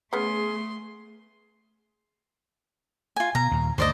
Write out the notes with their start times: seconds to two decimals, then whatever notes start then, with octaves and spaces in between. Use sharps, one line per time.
0.13 C#3 A3 B3 G#4 C6
3.16 F4 G#5
3.35 B2 A#5
3.51 D#2 A#2
3.78 D2 G2 D#3 C5 D5 D#5